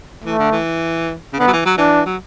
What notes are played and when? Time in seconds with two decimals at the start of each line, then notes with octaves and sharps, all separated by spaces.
0.25 E3 A3
0.39 D3
0.52 E3
1.33 C#3
1.39 D3 B3
1.48 F#3
1.53 E3
1.66 F#3
1.78 E3 D4
2.06 F#3